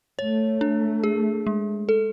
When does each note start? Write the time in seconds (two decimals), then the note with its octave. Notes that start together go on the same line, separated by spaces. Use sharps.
0.19 A3 C#5
0.61 D4
1.04 G#4
1.47 G#3
1.89 A4